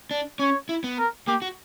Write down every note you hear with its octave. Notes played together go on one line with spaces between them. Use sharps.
D4
C#4 C#5
E4
B3
A#4
A#3 G4
F#4